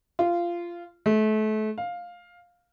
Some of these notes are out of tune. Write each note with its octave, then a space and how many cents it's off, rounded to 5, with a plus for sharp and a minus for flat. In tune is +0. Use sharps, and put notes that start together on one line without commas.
F4 -15
A3 -30
F5 +10